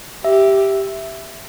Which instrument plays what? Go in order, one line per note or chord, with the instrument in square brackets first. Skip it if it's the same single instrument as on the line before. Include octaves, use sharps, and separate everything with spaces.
[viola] G4 [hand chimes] E5